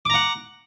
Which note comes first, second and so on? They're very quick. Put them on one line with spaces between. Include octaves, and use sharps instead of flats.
D6 A#5 F#5